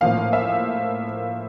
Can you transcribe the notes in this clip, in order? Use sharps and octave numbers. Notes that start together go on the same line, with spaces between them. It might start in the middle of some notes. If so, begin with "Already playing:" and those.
A2 F3 A#3 F5
E5